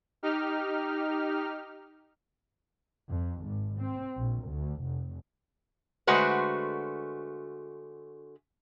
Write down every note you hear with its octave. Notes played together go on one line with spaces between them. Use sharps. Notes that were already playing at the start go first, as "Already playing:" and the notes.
D#4 G4 F6
F2
G#1
C4
A#1
D2
F1
D3 G#3 A3 F#4 B4 C5